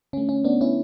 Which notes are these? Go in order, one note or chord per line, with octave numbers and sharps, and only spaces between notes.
D3 A3 C#4
C#4
B3 D4
C#4 E4